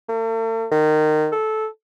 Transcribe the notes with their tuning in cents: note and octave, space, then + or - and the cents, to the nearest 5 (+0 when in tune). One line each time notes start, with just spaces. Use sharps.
A3 +45
D#3 -20
A4 -15